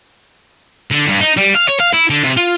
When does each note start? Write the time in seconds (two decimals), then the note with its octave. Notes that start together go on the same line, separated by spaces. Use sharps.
0.92 D3
1.08 G2
1.21 D#4
1.38 G3
1.55 F5
1.69 C#5
1.80 F5
1.94 E4
2.10 D3
2.23 C3
2.37 F4